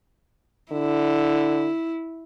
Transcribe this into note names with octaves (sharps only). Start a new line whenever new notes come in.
D3 E4